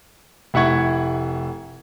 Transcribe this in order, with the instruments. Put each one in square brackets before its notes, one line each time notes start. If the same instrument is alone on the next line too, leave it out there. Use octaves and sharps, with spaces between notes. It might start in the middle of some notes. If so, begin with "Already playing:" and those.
[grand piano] F1 E4 F#5 C#6 G#6